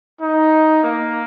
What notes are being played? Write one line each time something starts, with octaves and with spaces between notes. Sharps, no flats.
D#4
A#3